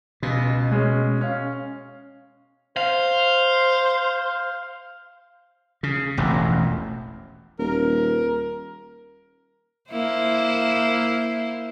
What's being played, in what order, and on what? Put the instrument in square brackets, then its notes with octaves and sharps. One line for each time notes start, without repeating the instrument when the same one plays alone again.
[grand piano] C#2 [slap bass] B2
[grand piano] G#3 C#4
C#4 F5
[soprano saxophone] C5 [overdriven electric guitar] F5
[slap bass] C#3
E1 A1 F2 B2
[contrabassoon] D#1 [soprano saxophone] A#4
[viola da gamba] A#3 E4 C5